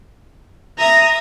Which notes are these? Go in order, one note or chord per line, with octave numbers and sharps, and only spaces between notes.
E5 A#5 D#6 A#6